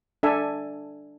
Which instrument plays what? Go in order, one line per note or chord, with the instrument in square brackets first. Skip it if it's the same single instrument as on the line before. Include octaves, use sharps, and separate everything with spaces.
[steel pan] D4 A4 E5 G#5